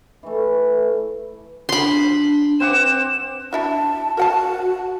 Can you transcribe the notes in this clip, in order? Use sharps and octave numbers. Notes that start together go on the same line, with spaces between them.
E3 A3
D4 B5 C6
C4 F#5 D6 E7
D4 E4 F#4 A5
F#4 A#4 F#5 A5